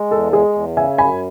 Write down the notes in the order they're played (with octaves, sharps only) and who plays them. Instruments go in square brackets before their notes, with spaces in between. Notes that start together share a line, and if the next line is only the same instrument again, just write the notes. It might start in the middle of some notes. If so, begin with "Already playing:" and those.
Already playing: [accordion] G#3
[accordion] E2 [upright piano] A4
[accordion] G#3 [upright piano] G#4
[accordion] E2
[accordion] C#3 [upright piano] E5 G#5
[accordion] F#2 [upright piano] G#5 B5